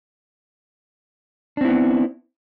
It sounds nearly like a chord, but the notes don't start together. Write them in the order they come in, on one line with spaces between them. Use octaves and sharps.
D4 C4 E4 B3